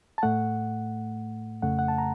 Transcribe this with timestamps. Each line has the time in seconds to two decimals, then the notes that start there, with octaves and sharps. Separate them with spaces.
0.18 A5
0.23 A2 A3 F#5
1.62 F2 C#3 A3 F#5
1.79 F#5
1.88 A5
1.98 A#5